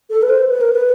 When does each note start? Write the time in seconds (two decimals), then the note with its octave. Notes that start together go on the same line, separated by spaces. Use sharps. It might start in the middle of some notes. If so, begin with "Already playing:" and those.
0.10 A4
0.22 B4
0.29 C5
0.49 B4
0.61 A#4
0.73 B4